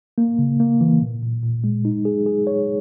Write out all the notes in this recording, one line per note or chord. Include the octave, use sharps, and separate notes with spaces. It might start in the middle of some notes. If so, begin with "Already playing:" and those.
A#3
C#3
A#3
E3
A#2
A#2
A#2
G#3
D#4
G#4
G#4
C#5